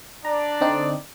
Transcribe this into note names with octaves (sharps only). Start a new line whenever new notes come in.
D4 D5 A#5
D3 C4 D#4